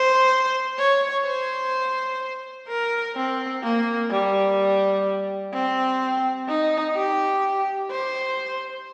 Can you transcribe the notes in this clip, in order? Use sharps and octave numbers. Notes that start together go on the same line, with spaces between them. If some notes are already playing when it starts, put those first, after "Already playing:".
Already playing: C5
C#5
C5
A#4
C4
A#3
G3
C4
D#4
G4
C5